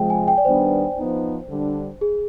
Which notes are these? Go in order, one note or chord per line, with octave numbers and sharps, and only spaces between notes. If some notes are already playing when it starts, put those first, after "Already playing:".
Already playing: C3 F3 G#3 G5
G#5
G5
D5
D#3 G3 B3 D4 C5
F3 B3 D#4
D3 G3 D4
G#4